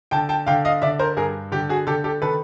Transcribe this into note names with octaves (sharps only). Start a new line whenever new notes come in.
D3 G5 A5
G5 A5
D3 F5 G5
D#5 F5
D3 D5 E5
A#4 C5
G2 G#4 A#4
D3 G4
F#4 G#4
D3 G4 A4
G4 A4
D#3 A4 B4